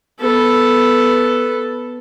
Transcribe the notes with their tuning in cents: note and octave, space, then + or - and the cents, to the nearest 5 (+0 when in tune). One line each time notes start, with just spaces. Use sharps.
B3 +0 A4 +0